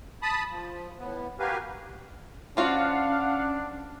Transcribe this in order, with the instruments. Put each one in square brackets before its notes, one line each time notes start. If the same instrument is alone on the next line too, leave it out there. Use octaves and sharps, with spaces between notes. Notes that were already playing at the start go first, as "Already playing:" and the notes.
[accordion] A5 B5 D#6
F3
A2 B3
F#4 G4 A#4 B4 F5 G#5
[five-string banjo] F3 F4 F#4 [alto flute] C#4 [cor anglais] D4 [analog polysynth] F5 F#5